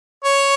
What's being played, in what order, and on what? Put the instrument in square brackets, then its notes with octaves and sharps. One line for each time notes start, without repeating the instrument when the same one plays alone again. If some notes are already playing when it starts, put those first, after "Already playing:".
[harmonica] C#5